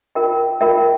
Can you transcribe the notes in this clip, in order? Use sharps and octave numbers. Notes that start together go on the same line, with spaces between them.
F4 A#4 E5 G5
F4 A#4 E5 G5